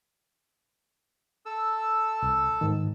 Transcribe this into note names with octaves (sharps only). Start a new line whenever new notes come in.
A4 E6
C2
G#2 D#3